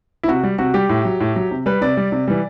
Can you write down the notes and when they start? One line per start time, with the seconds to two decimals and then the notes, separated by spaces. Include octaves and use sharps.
0.23 E4
0.28 C3 F#4
0.43 G3
0.58 C3 F#4
0.74 G3 G4
0.89 A2
1.05 F#3
1.20 A2
1.36 F#3
1.51 C3
1.66 G3 B4
1.81 C3 D5
1.97 G3
2.12 C3
2.28 E3 G3